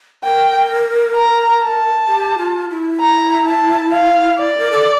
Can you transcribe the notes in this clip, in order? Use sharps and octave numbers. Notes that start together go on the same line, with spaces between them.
A#4 G5
A#5
A5
G4
F4
E4
A#5
A5
F5
D5
A#4
A4